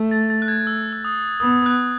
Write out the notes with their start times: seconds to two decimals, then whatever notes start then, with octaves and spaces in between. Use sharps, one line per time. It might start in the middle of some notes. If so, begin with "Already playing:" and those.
Already playing: A3
0.11 A6
0.30 A6
0.42 F#6
0.48 G#6
0.67 E6
0.93 E6
1.05 D#6
1.40 B3 D#6
1.66 F#6